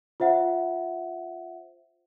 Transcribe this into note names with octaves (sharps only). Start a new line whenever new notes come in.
F4 C5 E5 F#5